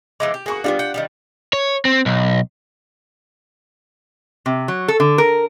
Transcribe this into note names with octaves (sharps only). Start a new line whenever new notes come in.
E3 F3 G#3 D6
G4
A#3 F#4 G#4 C#6
G3 A#3 B3 D4 F4 G4
F#5 G5
D#3 F3 G3
C#5
C4
B1
C3
F#3
A4
D3
A#4